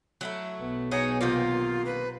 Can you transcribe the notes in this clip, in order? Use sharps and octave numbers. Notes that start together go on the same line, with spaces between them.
F#3 A3 E4
B1 B3
D#4 F#4 G#4 C#5
C3 D#3 A#3 F4
B4